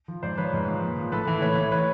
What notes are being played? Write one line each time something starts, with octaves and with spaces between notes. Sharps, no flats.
F3
G#2 C5 D5
F3 B4 C#5
G#2
F3
A#2
F3
A2 A4 B4
E3
A2 B4 C#5
E3
B4 C#5